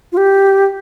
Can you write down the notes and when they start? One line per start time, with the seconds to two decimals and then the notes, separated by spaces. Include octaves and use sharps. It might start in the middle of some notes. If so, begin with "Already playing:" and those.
0.12 F4
0.17 G4